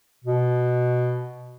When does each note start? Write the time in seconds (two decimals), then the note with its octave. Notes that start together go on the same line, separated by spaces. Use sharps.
0.25 B2